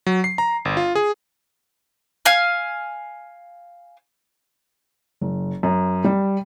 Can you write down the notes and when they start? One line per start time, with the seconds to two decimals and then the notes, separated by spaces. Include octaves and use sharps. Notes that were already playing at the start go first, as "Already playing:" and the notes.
0.06 F#3
0.24 C7
0.38 A#5
0.65 G1
0.77 F4
0.95 G#4
2.26 F5 G#5 F6
5.21 F#1
5.63 F#2
6.04 G3